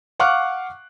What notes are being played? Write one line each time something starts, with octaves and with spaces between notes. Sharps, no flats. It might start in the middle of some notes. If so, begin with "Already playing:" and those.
F5 F#5 C#6 D6 F6 F#6